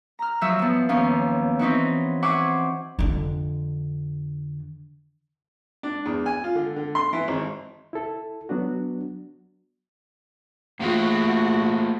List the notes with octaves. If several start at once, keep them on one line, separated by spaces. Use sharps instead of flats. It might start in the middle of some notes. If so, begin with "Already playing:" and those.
A#5 F6
F3 F#3 F#4 E5 E6
F3 B3
D#2 F3 B3 C#4 F5
E3 C4 C#4 D#4 E4 F#4
C5 E5 F#5 G#5 C#6 D6
F2 D3
D4
E2
G#5
F4
D3
D3
C6
E3
G#1
E4 A4
F#3 B3 D4 F#4
A3 A#3 F4 F#4 G#4